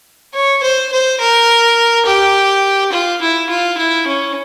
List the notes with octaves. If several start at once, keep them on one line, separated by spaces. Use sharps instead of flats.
C#5
C5
C5
A#4
G4
F4
E4
F4
E4
C#4